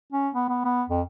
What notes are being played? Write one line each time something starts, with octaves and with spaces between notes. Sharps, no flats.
C#4
B3
B3
B3
F2